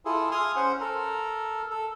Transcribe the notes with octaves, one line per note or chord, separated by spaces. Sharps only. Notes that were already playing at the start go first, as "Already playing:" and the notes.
E4 F4 G#4 A4
G#5 C6 D#6 F6
C#4 C5 F#5
A4 A#4
A4